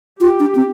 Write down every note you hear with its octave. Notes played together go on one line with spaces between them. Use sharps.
F4 G4
D4
C4